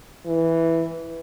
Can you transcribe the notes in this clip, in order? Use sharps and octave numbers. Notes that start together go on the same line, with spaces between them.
E3